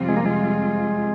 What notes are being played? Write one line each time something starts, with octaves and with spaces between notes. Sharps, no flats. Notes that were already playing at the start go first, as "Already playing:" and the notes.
Already playing: F2 C3 G3 C4 F4
G#3
A#3
G#3